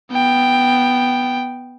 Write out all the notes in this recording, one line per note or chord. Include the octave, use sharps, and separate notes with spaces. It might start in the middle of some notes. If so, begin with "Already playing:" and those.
B3 G5